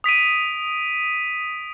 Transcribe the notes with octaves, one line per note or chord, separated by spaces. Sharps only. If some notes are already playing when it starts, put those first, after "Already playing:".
D#6 B6 D7 D#7